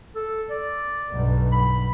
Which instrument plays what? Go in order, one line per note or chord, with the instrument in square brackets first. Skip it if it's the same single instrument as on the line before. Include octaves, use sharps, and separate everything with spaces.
[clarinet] A4
D5
[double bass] B1 G2
[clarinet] B5